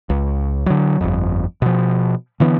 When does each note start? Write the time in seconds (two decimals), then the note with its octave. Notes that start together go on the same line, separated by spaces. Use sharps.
0.10 C#2
0.66 D3 F#3
1.01 G1 F2
1.62 B2 F3
2.40 D3 E3 B3